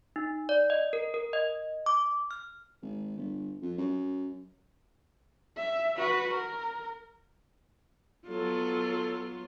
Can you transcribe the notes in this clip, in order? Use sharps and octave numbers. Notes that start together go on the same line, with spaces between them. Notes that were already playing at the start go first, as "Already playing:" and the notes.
D#4
D5
D#5
A#4
A#4
D#5
D6
F6
G#1
G1
F2
F#2
E5
F#4 B4
A#4
F#3 B3 F4 A4